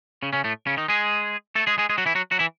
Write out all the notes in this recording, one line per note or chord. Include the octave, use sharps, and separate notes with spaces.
C#3 C#4
C#3 C#4
A2 A3
C#3 C#4
D#3 D#4
G#3 G#4
A3 A4
G#3 G#4
G#3 G#4
G#3 G#4
F#3 F#4
E3 E4
F#3 F#4
F#3 F#4
E3 E4